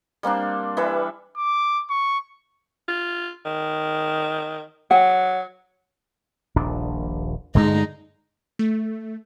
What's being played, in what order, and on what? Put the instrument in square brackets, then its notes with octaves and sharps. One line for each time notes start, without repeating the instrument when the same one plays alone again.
[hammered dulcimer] G3 A#3 C4 D4
E3 G3 B4 E5
[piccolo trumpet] D6
C#6
[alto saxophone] F4
D#3
[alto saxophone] F#3 [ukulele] F#5
[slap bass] D#1 A#1 D4
[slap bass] G2 D3 [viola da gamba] G#3 D#4
[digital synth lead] A3